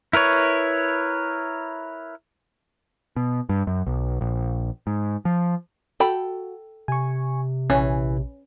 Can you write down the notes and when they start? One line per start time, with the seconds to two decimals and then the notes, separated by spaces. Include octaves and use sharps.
0.13 E4 A#4 B4 C#5
3.16 B2
3.49 G2
3.67 F#2
3.87 B1
4.21 A#1
4.87 G#2
5.25 F3
6.00 F#4 A4 G5 B5
6.88 C3 G#5 C#6
7.70 A#1 E3 C#4